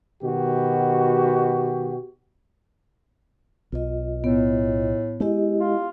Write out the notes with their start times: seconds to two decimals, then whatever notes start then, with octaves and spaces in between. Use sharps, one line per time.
0.23 B2 D#3 F#4 G4
3.72 B1 F4 D#5
4.24 A2 B3
5.20 G#3 E4 G4 D#5
5.60 F4